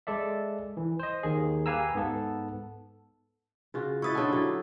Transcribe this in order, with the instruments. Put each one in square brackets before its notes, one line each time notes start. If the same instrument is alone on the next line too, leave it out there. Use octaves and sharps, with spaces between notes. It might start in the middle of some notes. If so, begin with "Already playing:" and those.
[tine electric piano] G#3 A4 D5 E5
E3
C5 D#5
D#2 D#3 G#4
G4 B4 F5 G#5 A#5 E6
G#2 B3 A4 A5
[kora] C#3 F4 F#4
[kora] E4 B4 D#5 [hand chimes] C#6 D#6 A6
[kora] D3 F4 A4 [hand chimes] C#5 F#5
[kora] F#3 E4 G4